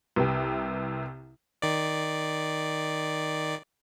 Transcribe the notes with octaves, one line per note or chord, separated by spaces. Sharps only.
C2 C3 B4 G5
D#3 D5